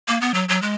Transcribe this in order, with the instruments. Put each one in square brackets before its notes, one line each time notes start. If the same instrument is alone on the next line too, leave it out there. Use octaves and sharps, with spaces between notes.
[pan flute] A#3
B3
F#3
F#3
G#3